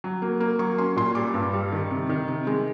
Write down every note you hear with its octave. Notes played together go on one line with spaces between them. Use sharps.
F#3
A#3
A#3
F#3 C#6
C#4 C6
A#2 C6
G3 D6
G2
G3
D#3
C3
D#3
C3
G#3